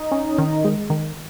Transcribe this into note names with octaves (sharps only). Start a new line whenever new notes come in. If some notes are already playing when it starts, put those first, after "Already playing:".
Already playing: D#4 D#5
C#4
D#3
G#3
D#3